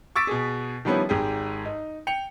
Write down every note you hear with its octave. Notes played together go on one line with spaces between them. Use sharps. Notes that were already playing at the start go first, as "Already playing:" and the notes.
C#6 D6 E6 A6 B6 D7
B2 G#4
D#3 F3 G3 B3 C#4 E4
G#1 G#2 G4 G#4
D#4
G5 C#7 F7